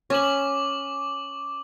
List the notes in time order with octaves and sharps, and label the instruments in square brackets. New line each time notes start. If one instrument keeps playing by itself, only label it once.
[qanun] C#4 [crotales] C#6 D6 F#7